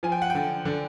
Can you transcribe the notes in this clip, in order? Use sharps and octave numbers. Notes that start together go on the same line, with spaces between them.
F3 G#5
G5
F#5
D3 G5
D3